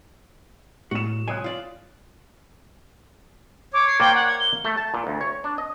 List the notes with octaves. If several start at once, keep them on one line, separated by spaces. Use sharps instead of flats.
A2 F#4 E7
C2 F3 C#5 G#5 D#6 F#6
F4 D5
C#5 D6
C7
A#3 C5 D5 G5
F#5
G#6
G7
A3
A5
A#2
D2
C#5
D4
D#5